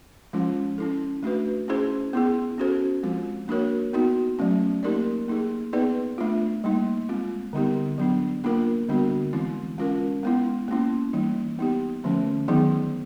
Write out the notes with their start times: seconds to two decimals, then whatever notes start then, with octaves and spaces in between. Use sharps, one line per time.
0.33 F3 G#3 C#4 F4
0.78 C#4 E4 A4
1.23 A3 D4 F#4 B4
1.68 C#4 E4 G#4 C5
2.13 B3 E4 G#4
2.58 C#4 F#4 A4 C5
3.03 F3 G#3 C4 F4
3.48 A#3 D4 F#4 A#4 C#5
3.93 B3 D#4 F#4
4.39 F#3 A3 C#4
4.83 A#3 D#4 G4 A#4 D5
5.28 A#3 D#4 G#4
5.73 B3 D#4 G#4 B4 D5
6.18 A3 D4 F4
6.64 G3 A#3 D#4
7.09 G#3 C4 F4
7.53 D3 G3 B3 D#4 G4
7.98 F#3 B3 D4
8.44 A#3 D4 F4 A#4
8.88 D3 G3 B3 D4 F#4
9.33 E3 G#3 C4 E4
9.78 G#3 C#4 F4 A#4
10.23 G#3 B3 E4
10.68 A#3 C#4 E4
11.13 E3 G3 A#3 D#4
11.59 B3 D#4 G4
12.04 D3 F3 A3 C#4
12.48 D#3 F#3 B3 D#4 G#4